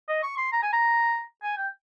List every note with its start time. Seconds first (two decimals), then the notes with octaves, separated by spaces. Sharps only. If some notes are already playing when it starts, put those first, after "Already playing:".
0.09 D#5
0.23 C#6
0.37 C6
0.52 A#5
0.62 G#5
0.73 A#5
1.43 G#5
1.57 G5